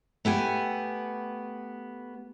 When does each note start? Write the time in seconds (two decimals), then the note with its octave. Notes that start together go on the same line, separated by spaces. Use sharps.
0.25 A3 B3 G4 G#5